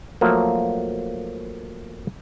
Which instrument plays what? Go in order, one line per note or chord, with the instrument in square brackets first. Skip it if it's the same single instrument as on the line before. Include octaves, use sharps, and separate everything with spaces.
[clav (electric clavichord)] F3 F#3 A3 A#3